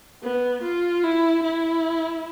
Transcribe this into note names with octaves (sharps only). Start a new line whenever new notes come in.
B3
F4
E4
E4